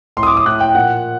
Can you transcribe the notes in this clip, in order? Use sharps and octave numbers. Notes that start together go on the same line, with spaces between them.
A2 C6
D#6
D6
D#6
A2 F#6
G5
A#2 F#5